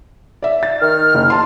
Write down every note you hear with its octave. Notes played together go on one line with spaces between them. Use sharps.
D5 E5
A6
D#3 F6
F#1
A5 C6 F6